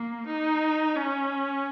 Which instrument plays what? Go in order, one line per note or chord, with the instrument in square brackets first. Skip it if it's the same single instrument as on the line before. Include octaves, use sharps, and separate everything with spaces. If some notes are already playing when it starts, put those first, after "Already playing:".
Already playing: [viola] A#3
D#4
C#4